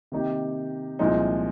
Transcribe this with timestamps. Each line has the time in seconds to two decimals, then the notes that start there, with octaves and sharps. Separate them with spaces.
0.12 C3 D#3 A#3 D#4 G4
0.99 C2 A#2 F3 G#3 D#4